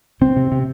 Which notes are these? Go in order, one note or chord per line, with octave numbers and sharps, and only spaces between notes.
C3 C4
C3
C3